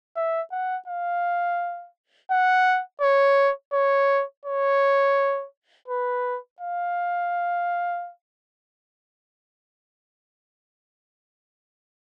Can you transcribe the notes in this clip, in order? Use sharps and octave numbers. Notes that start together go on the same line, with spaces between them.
E5
F#5
F5
F#5
C#5
C#5
C#5
B4
F5